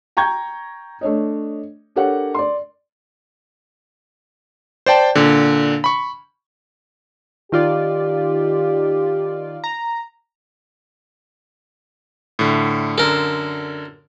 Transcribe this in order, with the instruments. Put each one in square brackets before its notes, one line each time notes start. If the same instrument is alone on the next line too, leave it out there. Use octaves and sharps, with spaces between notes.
[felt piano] G5 A#5 C#6 G6 G#6
A3 D4 C#5 D#5
D4 G4 A4 A#4 C#5 F#5
D5 C6
[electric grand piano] C5 D5 G5 A5
A#2 D3
B5 C#6
[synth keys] D#3 F4 D5 [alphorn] G4
[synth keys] A#5
[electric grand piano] A2 D3
[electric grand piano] F#2 D3 [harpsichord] A4 A#4